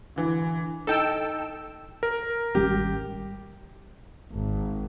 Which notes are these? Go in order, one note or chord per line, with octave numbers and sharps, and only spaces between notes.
D3 E3
D#4 A4 G5 E6
A#4
G#1 G3 C#4 G4
G#1